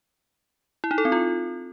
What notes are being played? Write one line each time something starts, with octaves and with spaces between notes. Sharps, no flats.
E4
D#4
A4
C4
F4